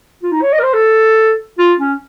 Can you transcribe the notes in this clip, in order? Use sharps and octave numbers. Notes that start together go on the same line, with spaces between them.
F4
D#4
C#5
D#5
A#4
C5
A4
F4
C#4